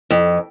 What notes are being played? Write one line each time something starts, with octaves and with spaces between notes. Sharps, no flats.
F2